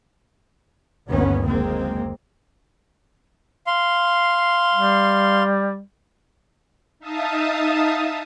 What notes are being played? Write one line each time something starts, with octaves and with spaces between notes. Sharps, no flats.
G1 D2 D#3 A#3 B3 C#4
F#1 G#3 A#3 C4
F5 C6
G3
D#4 E5 F5 A5 D#6